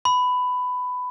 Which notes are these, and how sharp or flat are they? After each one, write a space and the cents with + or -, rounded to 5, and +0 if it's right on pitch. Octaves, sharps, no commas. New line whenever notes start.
B5 +15